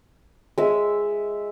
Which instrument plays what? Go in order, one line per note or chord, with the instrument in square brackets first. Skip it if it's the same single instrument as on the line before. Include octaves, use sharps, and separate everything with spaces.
[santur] G#3 E5